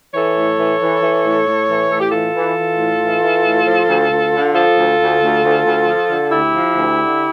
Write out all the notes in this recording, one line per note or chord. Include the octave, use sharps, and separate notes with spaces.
E3 A4 C#5
A2
E3
E3
E3
A2
A2
E3
A2 A4
G4
E3 F4 A4
E3
E3
A2
E3
E3
A2
F3
D2
D2
D3
F3 F4 A4
D2
D2
D2
D2
D2
F3
D3
D2 E4 G4
F3
D2
D3